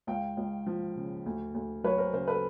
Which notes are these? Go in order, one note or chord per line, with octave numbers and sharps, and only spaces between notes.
C#2 F5 G5
C#2
F3
C#3
D2
D2
F#3 B4 C#5
A#4 C5
C#3 A#4 C5
A4 B4